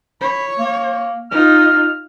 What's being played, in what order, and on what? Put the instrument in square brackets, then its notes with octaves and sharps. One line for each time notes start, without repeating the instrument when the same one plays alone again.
[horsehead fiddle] C#5 [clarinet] B5
[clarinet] A#3
[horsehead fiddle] D#4 F4 [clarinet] F6